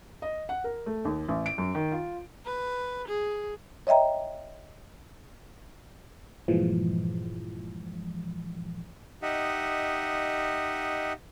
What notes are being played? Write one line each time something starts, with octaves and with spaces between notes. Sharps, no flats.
D#5
F#5
A#4
A3
D#2
A1
D7
F#2
D#3
F4
B4
G#4
C#5 D#5 E5 G5 A#5
G2 A#2 E3 F3 G#3
D#4 G4 D#5 E5 F#5